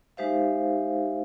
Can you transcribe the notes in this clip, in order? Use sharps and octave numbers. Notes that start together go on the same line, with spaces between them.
G#3 D#4 G4 C5 E5 F5